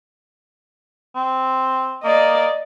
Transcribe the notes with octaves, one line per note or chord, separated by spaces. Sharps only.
C4
A#3 D5 D#5